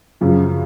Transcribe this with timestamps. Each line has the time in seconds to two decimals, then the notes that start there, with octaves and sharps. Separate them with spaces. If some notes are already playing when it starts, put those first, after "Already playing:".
0.21 F#2 C#3 F3